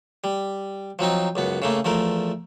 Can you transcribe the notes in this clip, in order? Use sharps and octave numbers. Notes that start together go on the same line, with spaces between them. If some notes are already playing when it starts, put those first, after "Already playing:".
G3
F3 F#3 C4 D#4
C#2 F#2 B3
C#3 A3 A#3
E2 F3 A3 A#4